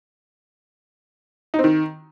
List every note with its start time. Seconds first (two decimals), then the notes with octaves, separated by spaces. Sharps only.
1.54 D#4
1.59 C4
1.64 D#3